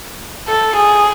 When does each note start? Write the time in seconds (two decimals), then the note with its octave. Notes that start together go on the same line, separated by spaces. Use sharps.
0.48 A4
0.76 G#4